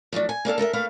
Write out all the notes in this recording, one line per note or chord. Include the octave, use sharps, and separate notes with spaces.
F3 F#3 A3 D4
G#5
A#3 D4 A4 F5
A4 A#4 D#5 E5
A3 A#3 B4 F5